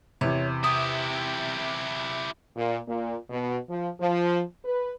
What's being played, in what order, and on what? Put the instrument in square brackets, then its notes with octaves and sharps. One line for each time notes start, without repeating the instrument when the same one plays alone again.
[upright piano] E2 C3 [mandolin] C#5
[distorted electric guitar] E4 G4 [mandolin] D#6
[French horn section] A#2
A#2
B2
F3
F3
B4